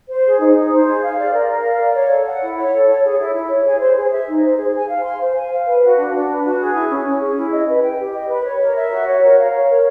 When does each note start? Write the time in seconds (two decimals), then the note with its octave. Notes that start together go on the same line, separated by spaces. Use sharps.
0.09 C5
0.25 G#4
0.40 D#4
0.56 D#4
0.71 C5
0.87 G#4
1.02 F5
1.18 D5
1.33 A#4
1.49 A#4
1.64 F5
1.79 D5
1.95 C#5
2.11 A4
2.26 F#5
2.41 E4
2.57 C#5
2.73 A4
2.88 C#5
3.03 G#4
3.19 E4
3.34 E4
3.49 C#5
3.65 G#4
3.80 C5
3.96 G#4
4.11 E5
4.27 D#4
4.43 C5
4.58 G#4
4.73 G#5
4.89 F5
5.04 C6
5.20 C5
5.35 G#5
5.51 F5
5.67 B4
5.82 F#4
5.97 D4
6.13 D4
6.28 B4
6.43 F#4
6.59 G#4
6.74 E4
6.90 C#4
7.06 C#4
7.21 G#4
7.36 E4
7.52 D#5
7.67 B4
7.83 G5
7.98 G4
8.13 D#5
8.29 B4
8.45 C#5
8.60 A#4
8.75 E5
8.91 F#4
9.07 C#5
9.22 A#4
9.38 F5
9.53 C#5
9.68 A#4